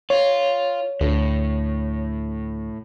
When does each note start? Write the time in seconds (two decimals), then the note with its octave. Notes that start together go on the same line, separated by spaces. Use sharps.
0.10 F4 C#5
1.01 D2 A2